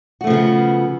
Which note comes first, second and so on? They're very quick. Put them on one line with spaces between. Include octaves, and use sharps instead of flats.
F#4 A3 F3 C#3 B3